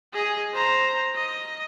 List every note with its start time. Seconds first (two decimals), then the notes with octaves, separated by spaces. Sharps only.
0.13 G#4 D#5
0.54 C5 A#5
1.15 D#5